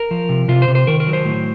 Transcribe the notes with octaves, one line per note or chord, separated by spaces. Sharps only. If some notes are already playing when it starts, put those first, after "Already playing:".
Already playing: A#4
F3
C3
C3 F4
C5
C3
C5
D#3 A#4
A#4
F#3
C5
A2